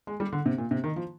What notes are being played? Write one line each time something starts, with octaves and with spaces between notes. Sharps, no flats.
G#3
G3
D3
C3
A#2
C3
D#3
F3